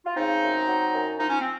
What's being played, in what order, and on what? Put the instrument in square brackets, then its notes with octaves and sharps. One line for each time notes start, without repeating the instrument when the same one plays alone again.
[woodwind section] F4
C#3 C4 D#4
F#2
F#3
F#2
F3 D#4
C#4
C4